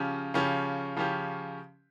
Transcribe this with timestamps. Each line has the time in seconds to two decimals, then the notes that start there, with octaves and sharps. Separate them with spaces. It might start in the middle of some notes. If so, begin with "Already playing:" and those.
Already playing: C#3 F3 C#4 G4
0.34 C#3 F3 C#4 G4
0.96 C#3 F3 C#4 G4